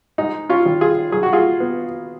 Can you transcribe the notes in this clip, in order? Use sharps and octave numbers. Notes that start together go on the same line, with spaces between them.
G#2 D#4
C#4 F4
G#1
F4 G#4
F#3 G#4
F#4
F4 G#4
B3